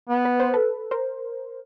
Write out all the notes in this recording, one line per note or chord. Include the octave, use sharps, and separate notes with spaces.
B3
B4
C5
A4 B4
A#4 C5